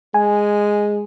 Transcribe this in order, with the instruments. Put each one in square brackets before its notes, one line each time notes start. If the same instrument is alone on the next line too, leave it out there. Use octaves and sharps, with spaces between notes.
[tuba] G#3 [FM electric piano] G#5